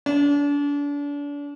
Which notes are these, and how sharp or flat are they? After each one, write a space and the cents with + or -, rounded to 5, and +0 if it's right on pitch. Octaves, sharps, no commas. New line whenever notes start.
D4 -35